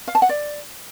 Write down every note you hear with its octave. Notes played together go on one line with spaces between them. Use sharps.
F5
A5
F#5
D5